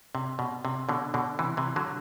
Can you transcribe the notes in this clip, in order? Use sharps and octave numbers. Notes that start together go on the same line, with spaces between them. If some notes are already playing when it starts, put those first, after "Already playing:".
C3
B2
C3
B2 D3
B2 D3
C3 E3
C3 E3
D3 F#3